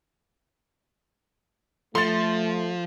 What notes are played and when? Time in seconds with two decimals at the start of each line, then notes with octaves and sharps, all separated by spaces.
1.95 F3 A3 A4 C6 A6